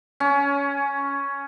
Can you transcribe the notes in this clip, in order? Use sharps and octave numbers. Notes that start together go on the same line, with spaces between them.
C#4